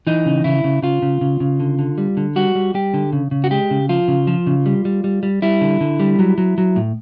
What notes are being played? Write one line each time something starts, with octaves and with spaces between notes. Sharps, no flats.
E3 D#4
C#3
C#3 E4
C#3
C#3 F4
C#3
C#3
C#3
D3
D3
G3
D3
G3 F#4
G3
G3 G4
D3
C#3
C#3
F#4
G#3 G4
C#3
F3 F4
C#3
F3
C#3
G3
G3
G3
G3
G3 E4
D3
D3
G3
F#3
F#3
F#3
A2